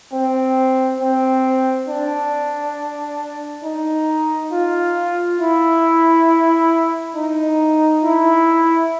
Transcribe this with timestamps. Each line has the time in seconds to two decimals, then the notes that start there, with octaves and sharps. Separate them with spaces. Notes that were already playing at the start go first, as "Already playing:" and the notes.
0.13 C4
1.00 C4
1.89 D4
3.64 D#4
4.52 F4
5.41 E4
7.16 D#4
8.04 E4